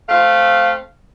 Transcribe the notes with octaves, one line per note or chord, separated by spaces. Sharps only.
A3 C4 F5